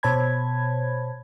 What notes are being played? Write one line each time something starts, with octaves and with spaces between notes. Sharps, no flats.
B2 C5 C#5 A5 B5 G#6